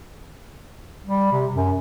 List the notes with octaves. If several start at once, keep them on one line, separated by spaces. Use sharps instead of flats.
G3
C3
F#2